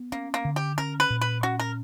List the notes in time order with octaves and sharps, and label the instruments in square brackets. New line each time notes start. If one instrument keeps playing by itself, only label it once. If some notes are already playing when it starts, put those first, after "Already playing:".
Already playing: [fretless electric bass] B3
[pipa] A#3 [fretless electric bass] C#4
[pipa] A#3
[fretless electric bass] D3
[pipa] G4
[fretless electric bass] C#4 [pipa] A#4
[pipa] B4
[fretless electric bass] A#2
[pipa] B4
[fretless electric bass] C#4 [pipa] F#4
[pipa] A#4